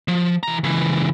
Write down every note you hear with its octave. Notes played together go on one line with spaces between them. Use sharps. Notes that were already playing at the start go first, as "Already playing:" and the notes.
F3
E3 A#5
C#2 E3